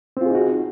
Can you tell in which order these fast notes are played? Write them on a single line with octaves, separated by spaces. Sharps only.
C4 F4 G#4 D#4 F#4